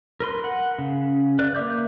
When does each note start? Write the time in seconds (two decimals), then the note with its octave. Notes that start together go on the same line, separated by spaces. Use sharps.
0.20 A#4 B4 C6
0.44 F#5
0.79 C#3
1.39 B4 D5 F#6
1.55 A#3 A#4 E5 D6 G6